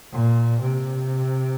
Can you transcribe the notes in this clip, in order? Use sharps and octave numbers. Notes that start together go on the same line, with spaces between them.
A#2
C3